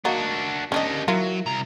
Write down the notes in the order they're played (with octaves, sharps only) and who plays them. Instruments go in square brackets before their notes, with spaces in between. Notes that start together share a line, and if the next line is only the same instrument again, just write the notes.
[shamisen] F#3 A#3 D#4 [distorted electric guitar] D4 F#4
[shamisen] C#4 D4 D#5 [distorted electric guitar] G4 A#4
[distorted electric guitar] F#3 [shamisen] E4 F4 A#4
[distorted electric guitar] C2 A#5